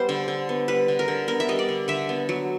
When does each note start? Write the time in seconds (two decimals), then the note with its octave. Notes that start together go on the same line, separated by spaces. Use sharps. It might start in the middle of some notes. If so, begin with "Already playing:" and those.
Already playing: G3 B3 C5
0.09 D3
0.28 D3
0.49 B3
0.68 G3 B4
0.88 D3
0.99 A#4
1.08 D3
1.28 B3 A#4
1.40 E5
1.49 G3 D#5
1.59 D5
1.69 D3
1.88 D3 E5
2.09 B3
2.29 F#3